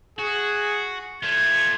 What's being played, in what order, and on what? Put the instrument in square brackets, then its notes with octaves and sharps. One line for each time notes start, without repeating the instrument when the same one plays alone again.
[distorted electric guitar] F#4 [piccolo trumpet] G#4
[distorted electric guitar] A3 F4 [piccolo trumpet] G#6